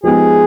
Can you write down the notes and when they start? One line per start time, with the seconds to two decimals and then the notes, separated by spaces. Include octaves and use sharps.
0.03 F3 G#3 B3 D#4 G4 G#4